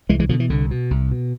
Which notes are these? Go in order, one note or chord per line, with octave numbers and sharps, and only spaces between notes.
C2 E3 G#3
E3 G#3
B2 D3 F3
E3
C2 D3
B2
C2
B2